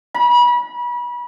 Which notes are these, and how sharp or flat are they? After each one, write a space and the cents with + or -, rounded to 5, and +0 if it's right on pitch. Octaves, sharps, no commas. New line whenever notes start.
B5 -35